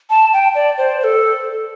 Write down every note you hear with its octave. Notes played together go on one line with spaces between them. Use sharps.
A5
G5
D5
C5
C5
A4